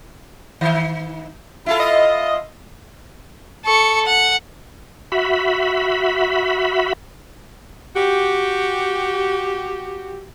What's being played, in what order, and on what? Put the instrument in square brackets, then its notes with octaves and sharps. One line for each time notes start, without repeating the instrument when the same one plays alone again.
[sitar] D#3
E4 F4 A4
[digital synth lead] D#5
[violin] A4 C#6
F#5
[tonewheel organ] F#4 E5 B5
[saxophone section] F#4 G4